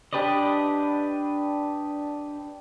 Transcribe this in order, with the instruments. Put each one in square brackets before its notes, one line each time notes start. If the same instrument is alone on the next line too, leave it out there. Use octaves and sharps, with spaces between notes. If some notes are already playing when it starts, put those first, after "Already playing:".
[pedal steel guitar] D4 G4 B4 D5 D#5